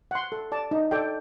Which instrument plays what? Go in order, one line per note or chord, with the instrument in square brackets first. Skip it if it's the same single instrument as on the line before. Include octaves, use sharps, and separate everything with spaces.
[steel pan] F#5 C6
A4
D5 A5
D#4
A4 D5 G5